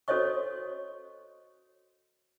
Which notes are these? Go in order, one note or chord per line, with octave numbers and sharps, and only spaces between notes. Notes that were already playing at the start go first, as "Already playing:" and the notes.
F#4 A4 C5 C#5 D#5 C#6